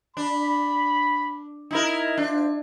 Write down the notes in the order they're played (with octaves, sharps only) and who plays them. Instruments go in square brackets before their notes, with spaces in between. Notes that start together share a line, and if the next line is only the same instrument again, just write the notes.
[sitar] D4 [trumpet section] B5
[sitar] D#4 E4 A#4
[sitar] D4 [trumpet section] F4 C5